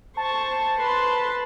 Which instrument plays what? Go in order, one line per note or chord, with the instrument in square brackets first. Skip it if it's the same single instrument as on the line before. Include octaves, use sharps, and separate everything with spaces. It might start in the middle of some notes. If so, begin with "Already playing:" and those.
[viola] C5 C#6 [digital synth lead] A5
[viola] B4 A5 [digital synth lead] C6